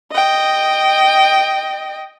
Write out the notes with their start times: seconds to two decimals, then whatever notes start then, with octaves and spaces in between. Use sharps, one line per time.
0.12 D#5 G5